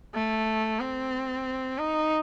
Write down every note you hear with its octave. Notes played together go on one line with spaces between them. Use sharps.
A3
C4
D#4